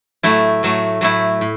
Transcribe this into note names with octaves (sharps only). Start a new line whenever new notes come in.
A2 F#3 A3 E4
A2 F#3 A3
A2 F#3 A3 E4
A2